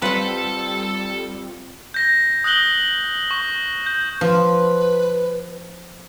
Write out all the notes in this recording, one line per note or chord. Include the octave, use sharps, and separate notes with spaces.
G3 C4 F4 A4 B4 F#5 A5
G6 A#6
D#6 F#6 A#6 F#7 G7
C#6
G6
F3 B4